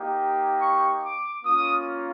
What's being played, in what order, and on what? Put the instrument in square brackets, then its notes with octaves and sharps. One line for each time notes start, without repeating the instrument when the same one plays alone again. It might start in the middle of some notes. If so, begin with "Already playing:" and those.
Already playing: [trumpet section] A#3 D#4 G4
C#6
D6
A#3 C#4 F4 D#6